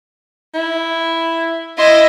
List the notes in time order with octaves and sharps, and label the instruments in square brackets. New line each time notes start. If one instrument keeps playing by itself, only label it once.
[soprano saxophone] E4
[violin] E4 D#5 [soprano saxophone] C6